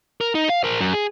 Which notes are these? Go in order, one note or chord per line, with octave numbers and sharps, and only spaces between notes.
A#4
D#4
F5
A#4 C5
F#2
G#4